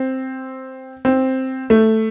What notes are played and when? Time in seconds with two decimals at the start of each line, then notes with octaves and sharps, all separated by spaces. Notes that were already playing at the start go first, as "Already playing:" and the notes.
Already playing: C4
1.05 C4
1.70 A3